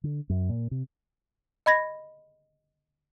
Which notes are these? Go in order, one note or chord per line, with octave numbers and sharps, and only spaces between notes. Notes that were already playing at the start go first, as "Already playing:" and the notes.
D3
F#2
A#2
C3
D#5 B5 G#6 A#6